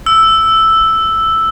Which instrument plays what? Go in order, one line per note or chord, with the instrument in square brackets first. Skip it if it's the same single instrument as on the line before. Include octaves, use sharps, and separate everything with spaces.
[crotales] E6